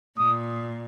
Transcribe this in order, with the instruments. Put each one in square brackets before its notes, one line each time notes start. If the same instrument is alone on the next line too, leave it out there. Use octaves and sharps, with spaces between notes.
[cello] A#2 [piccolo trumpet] D#6